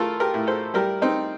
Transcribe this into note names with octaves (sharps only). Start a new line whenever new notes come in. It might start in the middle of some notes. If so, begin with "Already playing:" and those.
Already playing: A3 F4 A4 A#4
G4 A#4
A2
A4 C5
G3 G4 A#4
C4 D#4